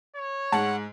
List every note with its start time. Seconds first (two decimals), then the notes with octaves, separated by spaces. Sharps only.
0.16 C#5
0.52 G#2 F#5 A5